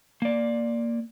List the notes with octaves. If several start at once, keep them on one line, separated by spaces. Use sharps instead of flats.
A#3 D5